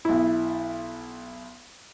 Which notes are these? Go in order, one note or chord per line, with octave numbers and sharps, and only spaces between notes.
B1 E4